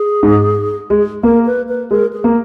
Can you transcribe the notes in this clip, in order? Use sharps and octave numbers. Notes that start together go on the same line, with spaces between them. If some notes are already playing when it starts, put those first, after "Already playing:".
Already playing: G#4
G#2
G#3
A#3 A#4
B4
B4
G#3 A#4
G#4
A#3